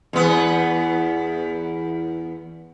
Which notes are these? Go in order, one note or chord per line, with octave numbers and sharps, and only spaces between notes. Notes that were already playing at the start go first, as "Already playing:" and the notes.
E2 B3